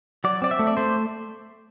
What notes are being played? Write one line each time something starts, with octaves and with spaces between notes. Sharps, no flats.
F#3 D5
C4 D5
E5
A3
D5
A3 C5